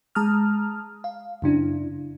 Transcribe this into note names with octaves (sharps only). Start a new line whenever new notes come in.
G#3 A5 A#5 D#6 F6
F5
F#2 C#3 D4 E4